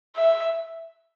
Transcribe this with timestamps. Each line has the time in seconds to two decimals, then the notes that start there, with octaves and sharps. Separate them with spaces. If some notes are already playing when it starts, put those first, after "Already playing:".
0.16 E5